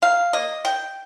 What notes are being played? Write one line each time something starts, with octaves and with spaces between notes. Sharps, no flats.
D#3 F5
A#3 D#5
D#3 G5